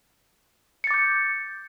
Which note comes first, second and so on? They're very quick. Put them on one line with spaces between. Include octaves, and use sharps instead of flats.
C#7 A6 D6 G6